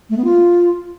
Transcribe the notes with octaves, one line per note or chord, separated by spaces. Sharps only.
A3
B3
F4